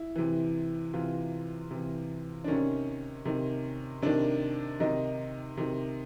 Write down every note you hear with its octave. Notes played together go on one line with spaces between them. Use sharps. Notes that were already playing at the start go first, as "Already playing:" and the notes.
Already playing: E4
C3 E3
C3 E3 F4
C3 E3
D4
C3 D#3 C#4
C3 D#3
C3 D#3 D4
C3 D#3 D#4
C3 D#3